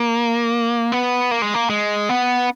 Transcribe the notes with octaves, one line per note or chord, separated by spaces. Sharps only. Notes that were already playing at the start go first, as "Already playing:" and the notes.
Already playing: A#3
B3
A#3
G#3
A#3
G#3
B3